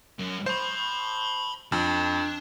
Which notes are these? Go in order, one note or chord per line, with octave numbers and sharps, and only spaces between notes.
F#2
C5 A5 B5
F2 D4